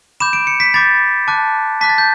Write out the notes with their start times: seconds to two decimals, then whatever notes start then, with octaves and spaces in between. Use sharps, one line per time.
0.20 B5 D6 G6 E7
0.33 D7
0.47 C#7
0.60 B6
0.74 B5 D6 G6 A6
1.28 A5 D6 F#6
1.81 A5 D6 F#6 B6
1.89 A6
1.98 G6